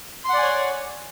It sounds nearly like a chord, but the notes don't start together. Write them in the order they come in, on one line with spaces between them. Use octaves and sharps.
C6 F#5 D5 G#5 C#5